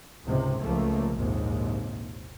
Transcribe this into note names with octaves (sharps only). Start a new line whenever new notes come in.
C#2 G#2 C3
C#2 F3 A3 A#3
A#1 D#2 G#2 C3